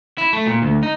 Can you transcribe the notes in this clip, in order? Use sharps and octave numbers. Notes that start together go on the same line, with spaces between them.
E4
A3
A#2
D2
D#4